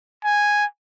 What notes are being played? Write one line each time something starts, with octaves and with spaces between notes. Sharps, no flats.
G#5